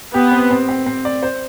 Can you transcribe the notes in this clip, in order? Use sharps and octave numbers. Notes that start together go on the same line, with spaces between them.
B3 G4
C4
C4
C4
C4
D5
C5